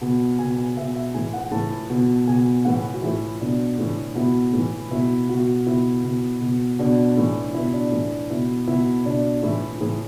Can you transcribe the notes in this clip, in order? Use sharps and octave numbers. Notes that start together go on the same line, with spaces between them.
B2
B2 G#5
G#5
B2 E5
E5
A2 E3 G#5
F#5
A2 E3 A5
B2
B2 G#5
A2 E3 F#5
B4
F#4
A2 E3 E4
B2 D4
A2 E3
B2 E4
A2 E3
B2 E4
B2 F#4
B2 E4
B2
B2
B2 D4
A2 E3
B2 E4
D4
A2 E3
B2 E4
B2 E4
B2 D4
A2 E3 E4
A2 E3 G#4